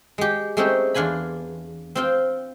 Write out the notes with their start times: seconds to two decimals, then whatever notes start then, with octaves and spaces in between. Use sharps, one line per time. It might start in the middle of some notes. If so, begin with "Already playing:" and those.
0.18 G#3 G4
0.57 G#3 A3 C4 C#4 D#4 G4
0.94 E2 D4 F4 G#5 B5
1.95 C4 F4 G5